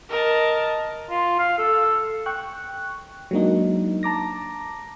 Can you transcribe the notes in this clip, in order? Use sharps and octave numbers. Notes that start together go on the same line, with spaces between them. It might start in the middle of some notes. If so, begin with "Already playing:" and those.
A#4 D#5 A5
F4
F5
A4
G5 C#6 F#6
F#3 G#3 A#3 D4 D#4
A5 A#5 D6 A#6